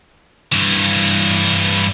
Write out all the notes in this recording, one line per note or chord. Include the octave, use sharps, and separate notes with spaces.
G2 E3